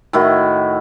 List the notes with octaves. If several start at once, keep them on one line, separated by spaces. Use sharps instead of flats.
A2 D#3 E4 F#4